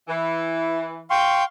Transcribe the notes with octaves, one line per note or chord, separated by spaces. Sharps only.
E3
F5 G5 C6 C#6